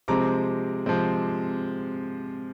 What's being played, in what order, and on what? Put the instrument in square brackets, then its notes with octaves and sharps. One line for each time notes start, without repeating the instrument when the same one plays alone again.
[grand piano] C3 F3 G#3 C4 A#5 D6
C3 F3 G#3 C4